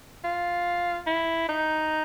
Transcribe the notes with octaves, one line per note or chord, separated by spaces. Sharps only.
F4
E4
D#4